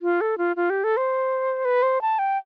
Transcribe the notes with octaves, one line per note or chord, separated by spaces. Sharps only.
F4
A4
F4
F4
G4
A4
C5
B4
C5
A5
G5